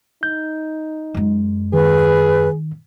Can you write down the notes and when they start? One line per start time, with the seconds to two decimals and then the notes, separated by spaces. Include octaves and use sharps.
0.23 D#4 G6
1.15 F#2 G#3
1.73 D#3 G#4 B4